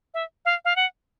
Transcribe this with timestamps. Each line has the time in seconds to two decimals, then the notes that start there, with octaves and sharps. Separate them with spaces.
0.14 E5
0.45 F5
0.65 F5
0.76 F#5